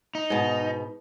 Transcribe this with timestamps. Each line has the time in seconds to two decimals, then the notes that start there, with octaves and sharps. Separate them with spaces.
0.15 D#4
0.30 G#2 B2